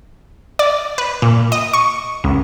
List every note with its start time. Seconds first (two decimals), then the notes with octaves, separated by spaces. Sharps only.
0.59 D5
0.98 B4
1.22 A#2
1.52 D#5
1.73 C#6
2.24 C#2